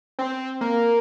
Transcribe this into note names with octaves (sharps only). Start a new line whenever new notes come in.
C4
A#3